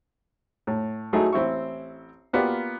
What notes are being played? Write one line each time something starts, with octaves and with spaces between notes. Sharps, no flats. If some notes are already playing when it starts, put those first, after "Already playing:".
A2
F#3 A3 D#4 E4 G#4
A1 C4 E4 C#6
A#3 B3 F4 G4 D5